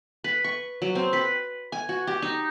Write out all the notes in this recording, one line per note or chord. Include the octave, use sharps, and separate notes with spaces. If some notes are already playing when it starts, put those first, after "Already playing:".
B4
C#6
F#3
C4
B4
G#5
F#4
G4
D#4